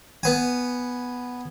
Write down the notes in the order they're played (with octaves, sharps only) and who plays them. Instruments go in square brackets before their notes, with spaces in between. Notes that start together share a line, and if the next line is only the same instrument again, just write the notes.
[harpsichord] B3 G#5